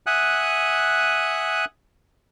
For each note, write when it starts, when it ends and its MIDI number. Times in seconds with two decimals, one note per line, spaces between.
0.07 1.65 76
0.07 1.65 78
0.07 1.65 80
0.07 1.65 87
0.07 1.65 90